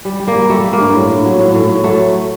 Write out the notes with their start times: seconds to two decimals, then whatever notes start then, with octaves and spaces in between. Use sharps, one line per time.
0.05 G3
0.20 G3
0.27 A#3
0.35 G3
0.50 G3 A3
0.64 G3
0.73 A#3
0.80 G2
0.94 A2
1.10 A2
1.24 F#3
1.39 A2
1.54 A2
1.69 A2
1.84 F#3 A3